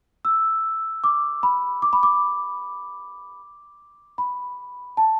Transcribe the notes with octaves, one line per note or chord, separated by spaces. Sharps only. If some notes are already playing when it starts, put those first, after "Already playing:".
E6
D6
B5
D6
B5
D6
B5
A5